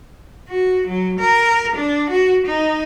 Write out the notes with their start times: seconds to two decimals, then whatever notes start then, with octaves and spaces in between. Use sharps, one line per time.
0.48 F#4
0.88 F#3
1.20 A#4
1.76 D4
2.11 F#4
2.47 D#4